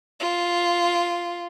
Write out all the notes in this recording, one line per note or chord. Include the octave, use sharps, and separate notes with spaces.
F4